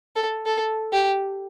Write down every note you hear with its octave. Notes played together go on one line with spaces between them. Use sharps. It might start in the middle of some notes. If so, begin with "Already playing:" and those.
A4
A4
G4